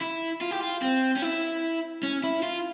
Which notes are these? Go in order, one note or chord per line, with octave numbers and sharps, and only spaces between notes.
E4
F4
G4
F4
C4
C#4
E4
C#4
E4
F4